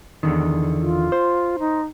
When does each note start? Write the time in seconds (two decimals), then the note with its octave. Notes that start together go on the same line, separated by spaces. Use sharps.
0.23 E2 D3 D#3
0.81 F4
1.12 C5
1.59 D#4